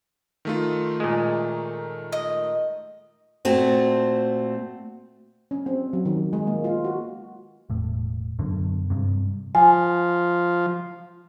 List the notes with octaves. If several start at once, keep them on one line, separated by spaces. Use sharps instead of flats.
D#3 A3 F4
A#2 G#3
D#5
A#2 A3 C4 F#4
C#4
C4
F#3
D#3
G#3
A#3
F4
F#4
E1 A2
F#2 B2 D3
G2 C3
F3 G#5